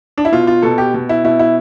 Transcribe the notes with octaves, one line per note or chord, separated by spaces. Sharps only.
D4
E4
B2 F4
F4
B2 A4
G4
B2
E4
B2 E4
E4